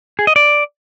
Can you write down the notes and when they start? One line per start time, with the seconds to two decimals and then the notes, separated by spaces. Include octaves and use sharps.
0.19 G#4
0.27 D#5
0.36 D5